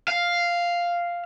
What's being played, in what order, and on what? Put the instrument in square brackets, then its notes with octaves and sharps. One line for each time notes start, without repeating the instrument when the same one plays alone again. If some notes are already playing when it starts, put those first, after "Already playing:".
[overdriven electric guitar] F5